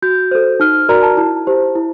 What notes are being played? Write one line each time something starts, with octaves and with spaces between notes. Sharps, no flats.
F#4 G6
A4 C5
D#4 F6
F#4 A#4 D5 A#5
A5
E4 A5
G4 C5
E4